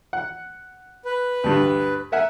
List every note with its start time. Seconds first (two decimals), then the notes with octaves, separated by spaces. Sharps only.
0.13 F#5
1.05 B4
1.44 D2 G2
2.12 A#4 E5 F#5 G#5